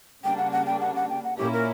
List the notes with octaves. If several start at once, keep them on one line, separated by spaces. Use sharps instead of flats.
C#3 G3 A#3 D4 G5
F#5
F#5
G5
F#5
F#5
G5
F#5
A#2 A#3 C#4 E4 G4
A#4